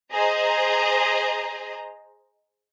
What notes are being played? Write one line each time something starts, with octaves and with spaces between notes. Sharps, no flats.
G#4 C5 D#5 A#5